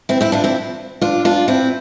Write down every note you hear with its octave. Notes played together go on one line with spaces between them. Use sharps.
C4 E4
C4 E4
D4 F4
C4 E4
D4 F4
D4 F4
C4 E4